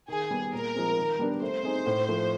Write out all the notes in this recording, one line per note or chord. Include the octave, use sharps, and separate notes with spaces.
D#3 G#4
G3 B3
A#2 A#4
F3 G#3 C4
D#3
G3 B3 D4 G4
A3 C5
C4 D#4 G#4
A2
F3 A3